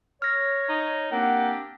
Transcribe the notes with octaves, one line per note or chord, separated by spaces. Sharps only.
C#5 F6 A#6
D#4
A#3 C4 D4 G4 F#5